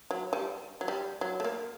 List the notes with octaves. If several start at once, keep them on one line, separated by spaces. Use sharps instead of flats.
F#3
G3
F#3
G3
F#3
A3
A#3